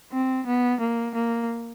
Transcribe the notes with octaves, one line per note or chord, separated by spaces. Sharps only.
C4
B3
A#3
A#3